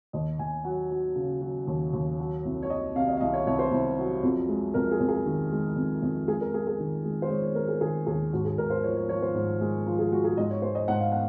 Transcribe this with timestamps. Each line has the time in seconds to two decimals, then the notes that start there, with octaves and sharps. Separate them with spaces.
0.13 D#2 D#5
0.39 D#2 G#5
0.64 F#3 F#5
0.91 F#3
1.16 C#3
1.41 F#3
1.67 D#2
1.93 D#2
2.19 F#3
2.45 C2
2.63 C#5
2.70 F#3 D#5
2.95 C3 F5
3.08 D#5
3.17 F5
3.20 C2 D#5
3.34 C#5
3.46 C2 C#5
3.59 C5
3.71 C2
3.98 F#3
4.23 F2
4.48 G#3
4.74 F2 A#4
4.91 G#4
5.00 F2
5.08 G#4
5.26 D#3
5.52 G#3
5.76 F2
6.02 F2
6.28 G#3 G#4
6.41 A#4
6.53 G#3 G#4
6.67 G#4
6.80 D#3
7.05 G#3
7.22 C5
7.30 G#3 C#5
7.43 C#5
7.55 G#3 A#4
7.68 G#4
7.81 D#3 G#4
8.07 D#2 G#4
8.33 G#2 F#4
8.45 G#4
8.58 G#2 A#4
8.70 C5
8.84 F3 C#5
8.97 C#5
9.09 F3 C#5
9.22 C5
9.35 G#2
9.61 G#3
9.87 F3
9.99 G#4
10.12 G#3 F#4
10.24 G#4
10.37 G#2 D#5
10.51 C#5
10.62 G#3 C5
10.75 D#5
10.88 G#2 F#5
11.00 F5
11.12 F#5